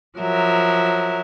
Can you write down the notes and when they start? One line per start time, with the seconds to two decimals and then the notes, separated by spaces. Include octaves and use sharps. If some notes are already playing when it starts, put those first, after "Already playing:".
0.19 F3 F#3 A#4 E5